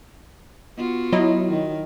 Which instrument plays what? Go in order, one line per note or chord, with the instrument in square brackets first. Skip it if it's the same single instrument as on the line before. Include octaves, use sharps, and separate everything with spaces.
[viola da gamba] B3 F4 F#4
[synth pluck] F#3 E4 D#5
[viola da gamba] D#3